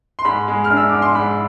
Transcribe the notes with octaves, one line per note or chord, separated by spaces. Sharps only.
C6
G#2 B5
G#3
F6
D4
E6
G#2 D6
C6
G#2 B5